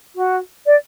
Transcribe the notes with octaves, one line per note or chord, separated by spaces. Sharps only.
F#4
D5